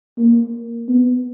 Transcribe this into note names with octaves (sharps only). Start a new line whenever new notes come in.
A#3
B3